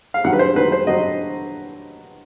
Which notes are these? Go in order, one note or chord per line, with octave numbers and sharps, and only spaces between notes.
F5
G2 D#3 F#3 F#5
B4
C5
G2 D#3 F#3 B4
C5
G2 D#3 F#3 D#5